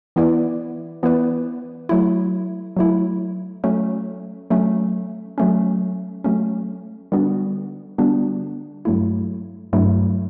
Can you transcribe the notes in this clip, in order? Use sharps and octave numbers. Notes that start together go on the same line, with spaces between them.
E3 B3 E4 B4 D5
E3 B3 E4 B4 D5
F#3 A3 E4
F#3 A3 E4
F#3 A3 C#4
F#3 A3 C#4
F#3 A3 C#4
F#3 A3 C#4
D3 G3 B3 D4 F#4
D3 G3 B3 D4 F#4
G2 F#3 A3 E4
G2 F#3 A3 E4